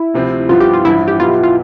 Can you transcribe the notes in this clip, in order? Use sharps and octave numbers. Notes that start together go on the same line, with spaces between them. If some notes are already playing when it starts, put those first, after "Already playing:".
Already playing: E4
D2 C3 F3 C4
G2 F3 B3 F4
G4
F4
A1 G2 F3 E4
G4
B1 B2 B3 E4 F4
F4